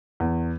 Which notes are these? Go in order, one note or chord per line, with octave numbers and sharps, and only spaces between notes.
E2